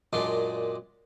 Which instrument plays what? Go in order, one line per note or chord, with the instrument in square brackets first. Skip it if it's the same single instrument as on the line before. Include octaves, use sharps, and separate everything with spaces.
[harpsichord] F#2 A#2 G#3 D4 C6